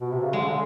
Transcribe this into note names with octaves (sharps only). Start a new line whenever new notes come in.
B2
C3
C#3
D3 G#3
C#3
D3